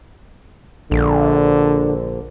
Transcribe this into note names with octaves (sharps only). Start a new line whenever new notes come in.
A#1 D3